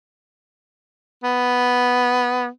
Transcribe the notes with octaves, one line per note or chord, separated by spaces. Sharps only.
B3